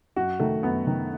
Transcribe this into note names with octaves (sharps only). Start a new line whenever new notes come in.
F#2 F#4
D#3 A3
F#2 B3
D#3